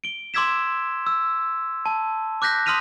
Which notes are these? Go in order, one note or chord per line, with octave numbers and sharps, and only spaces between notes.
D7 G7
C6 D6 E6 G#6 B6 E7
E6
A5
D6 F#6 G6 A#6 B6
C6 D#6 F6 B6 D#7 F7